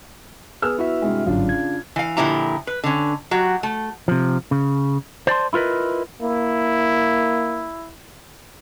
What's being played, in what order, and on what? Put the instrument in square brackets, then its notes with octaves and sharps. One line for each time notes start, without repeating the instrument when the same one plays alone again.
[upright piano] B3 E6 F6 [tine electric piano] G#4
[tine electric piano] E4 F#4 E5
[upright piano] G2 C3 G#3
[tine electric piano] G1 G#2 F#3 [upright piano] C#3 D4 F4
[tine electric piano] G#6
[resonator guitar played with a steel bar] E3 F5
A#2 D3 F3 E4 G4 A#5
B4
D3 C#4
F#3 F#4 G4
A3
[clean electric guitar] C3 F3
C#3
C5 D5 A5 C6
E4 F4 A#4 B4 D#5
[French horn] A#3 [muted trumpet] E4